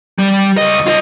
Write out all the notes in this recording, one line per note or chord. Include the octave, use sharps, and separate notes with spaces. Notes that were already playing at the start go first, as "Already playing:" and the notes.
G3
C#2 D#5
F4 D#5